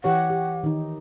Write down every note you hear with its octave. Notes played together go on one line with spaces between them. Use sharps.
E3 G4 C#5 F#5
G4
D#3 D#4